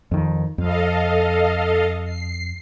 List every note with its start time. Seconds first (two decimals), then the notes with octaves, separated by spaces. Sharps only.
0.11 F2 D#3
0.58 F2 A4 D#5 F5
2.04 C7